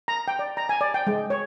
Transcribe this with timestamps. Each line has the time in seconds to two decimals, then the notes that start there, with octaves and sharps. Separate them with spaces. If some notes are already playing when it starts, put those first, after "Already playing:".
0.08 A#5
0.28 G5
0.39 D5
0.57 A#5
0.69 G#5
0.81 D5
0.94 G5
1.07 G#3
1.30 C#5